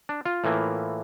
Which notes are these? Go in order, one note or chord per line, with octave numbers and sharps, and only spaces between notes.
D4
F4
A2 E3 A#3